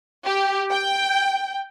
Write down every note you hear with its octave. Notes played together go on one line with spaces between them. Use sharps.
G4
G5